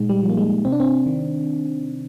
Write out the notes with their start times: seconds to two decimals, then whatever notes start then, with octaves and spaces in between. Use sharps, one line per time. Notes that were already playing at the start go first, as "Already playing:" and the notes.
Already playing: A#2 G#3 D#4
0.09 G3
0.23 F3
0.30 A#3
0.37 G#3
0.65 C3 C4
0.72 D4
0.80 C4
1.06 D#3